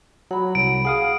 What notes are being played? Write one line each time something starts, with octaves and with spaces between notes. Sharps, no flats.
F#3 F#5 B5
C2 D7
G#4 F5 F#5 D#6